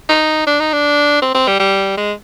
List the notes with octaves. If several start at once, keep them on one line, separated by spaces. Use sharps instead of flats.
D#4
D4
D#4
D4
C4
C4
G3
G3
G#3